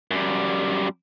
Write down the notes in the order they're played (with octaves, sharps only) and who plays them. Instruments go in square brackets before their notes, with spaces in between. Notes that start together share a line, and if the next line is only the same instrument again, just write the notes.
[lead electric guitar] F#2 G3